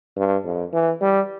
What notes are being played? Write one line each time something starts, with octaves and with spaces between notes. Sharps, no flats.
G2
F2
E3
G3